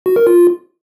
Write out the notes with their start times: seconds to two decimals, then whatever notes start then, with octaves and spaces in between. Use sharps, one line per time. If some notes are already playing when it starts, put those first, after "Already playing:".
0.06 F#4
0.16 A#4
0.27 F4